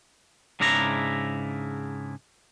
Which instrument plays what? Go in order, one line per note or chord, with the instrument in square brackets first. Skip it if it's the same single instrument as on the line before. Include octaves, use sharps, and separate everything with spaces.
[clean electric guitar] G#2 C#3 D4 E4 A#5